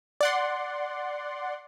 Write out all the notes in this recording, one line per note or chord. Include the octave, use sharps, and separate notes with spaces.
D5 F#5 C6